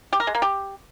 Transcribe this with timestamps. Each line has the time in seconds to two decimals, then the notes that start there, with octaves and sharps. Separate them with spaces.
0.13 G4
0.20 A#4
0.27 G#3
0.35 A#3
0.42 G4